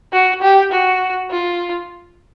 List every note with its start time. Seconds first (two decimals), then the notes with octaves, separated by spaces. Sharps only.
0.13 F#4
0.42 G4
0.71 F#4
1.30 F4